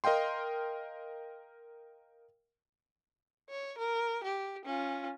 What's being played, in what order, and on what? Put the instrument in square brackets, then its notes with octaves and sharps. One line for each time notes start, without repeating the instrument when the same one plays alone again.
[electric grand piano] A#4 D#5 F5 G5 C6
[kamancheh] C#5
A#4
G4
C#4 F4